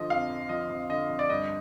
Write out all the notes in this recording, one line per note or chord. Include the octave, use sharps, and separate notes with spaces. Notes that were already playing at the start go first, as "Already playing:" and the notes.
Already playing: D3 F3 D#5
F2 F5
F2
F3 D#5
F2
D3 D#5
F2
D5
G2 D#5